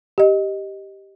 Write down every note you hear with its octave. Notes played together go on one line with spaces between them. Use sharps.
G4 D#5